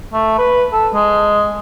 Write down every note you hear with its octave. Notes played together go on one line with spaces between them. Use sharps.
A3
B4
A4
G#3